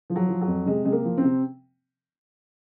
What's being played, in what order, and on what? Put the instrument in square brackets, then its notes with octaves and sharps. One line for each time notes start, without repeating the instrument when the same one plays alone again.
[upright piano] F3
F#3
F3
F#3
F2
C3 G#3
C3 G#3
A#3
F3
C4
C3